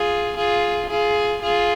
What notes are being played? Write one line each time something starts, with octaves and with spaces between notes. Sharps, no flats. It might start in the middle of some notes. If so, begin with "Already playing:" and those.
Already playing: F4 G#4
F4 G#4
F4 G#4
F4 G#4